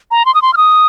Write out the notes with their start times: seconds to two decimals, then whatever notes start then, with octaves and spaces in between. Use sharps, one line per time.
0.11 A#5
0.25 C6
0.35 D#6
0.42 C6
0.53 F6
0.57 D#6